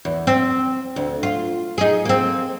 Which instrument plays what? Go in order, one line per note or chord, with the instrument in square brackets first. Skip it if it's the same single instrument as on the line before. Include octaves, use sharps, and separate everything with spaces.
[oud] E2
C4
D2
F4
D#4 G#4
A#3 C4